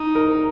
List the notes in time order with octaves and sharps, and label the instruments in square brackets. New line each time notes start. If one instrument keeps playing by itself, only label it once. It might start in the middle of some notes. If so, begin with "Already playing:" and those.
Already playing: [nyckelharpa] D#4
[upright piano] A#4